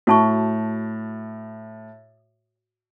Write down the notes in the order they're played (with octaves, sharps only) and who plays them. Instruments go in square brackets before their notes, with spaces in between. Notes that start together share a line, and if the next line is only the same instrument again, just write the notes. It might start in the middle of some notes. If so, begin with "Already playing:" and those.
[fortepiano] A2 [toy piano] F#4 A5 C#6